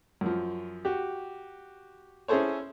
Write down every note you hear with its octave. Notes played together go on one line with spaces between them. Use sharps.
F#2 F3
F#4 G4
C#4 E4 G#4 A4 C5 C#5